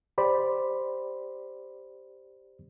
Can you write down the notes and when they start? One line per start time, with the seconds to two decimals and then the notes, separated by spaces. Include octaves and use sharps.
0.18 G4 C5 D5 B5